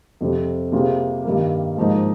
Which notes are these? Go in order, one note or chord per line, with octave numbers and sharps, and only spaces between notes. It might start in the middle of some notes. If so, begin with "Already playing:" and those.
F2 C3 G3
C3 G3 A#3 F4 G#4
G2 D#3 G3 A#3
G#2 F3 A#3 D#4